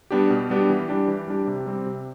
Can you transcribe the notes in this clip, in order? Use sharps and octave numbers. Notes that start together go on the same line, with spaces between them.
G3 B3 D4 G4
B2
G3 B3 D4 G4
E3
G3 D4 G4
E3
G3 D4 G4
C3
G3 C4 G4
C3